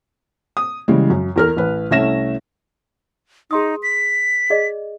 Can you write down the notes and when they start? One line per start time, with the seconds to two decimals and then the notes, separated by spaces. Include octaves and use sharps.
0.57 D#6
0.88 C#3 E3 G3 G#3
1.10 F#2
1.36 E2 A#4 F6
1.57 A1 B4
1.91 C2 A3 C#4 E5 A#6 E7
3.51 D#4 G#4 C6 D#6
3.83 B6
4.50 G#4 D5 D#5